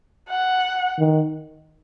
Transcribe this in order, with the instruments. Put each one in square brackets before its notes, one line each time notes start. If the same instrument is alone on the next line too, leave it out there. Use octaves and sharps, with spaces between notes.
[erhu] F#5
[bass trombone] D#3